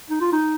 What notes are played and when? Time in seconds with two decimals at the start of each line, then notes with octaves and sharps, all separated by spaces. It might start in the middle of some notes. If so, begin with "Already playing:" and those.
0.10 D#4
0.21 F4
0.32 D#4